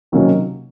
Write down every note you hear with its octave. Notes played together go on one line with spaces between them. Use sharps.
C3 D#3 F#3 A#3 C#4